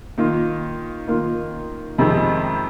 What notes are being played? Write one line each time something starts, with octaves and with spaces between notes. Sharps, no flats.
D#3 A#3 F4
D#3 A#3 F4
F2 C3 D#3 G#3 C4